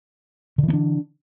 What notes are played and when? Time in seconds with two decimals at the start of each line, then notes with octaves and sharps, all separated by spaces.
0.58 D3
0.63 E3
0.68 B3
0.73 D4